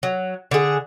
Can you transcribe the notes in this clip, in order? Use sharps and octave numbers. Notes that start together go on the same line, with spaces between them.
F#3
D3 G#4